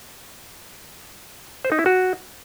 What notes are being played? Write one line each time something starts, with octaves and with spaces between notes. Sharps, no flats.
C5
D#4
E4
F#4